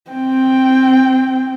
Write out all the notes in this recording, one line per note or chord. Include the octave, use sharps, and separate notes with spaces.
C4 G5